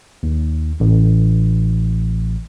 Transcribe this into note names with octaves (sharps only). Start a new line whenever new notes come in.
D#2
A1